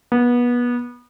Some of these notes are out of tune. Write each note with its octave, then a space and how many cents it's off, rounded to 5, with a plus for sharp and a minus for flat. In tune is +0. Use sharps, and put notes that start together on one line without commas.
B3 -25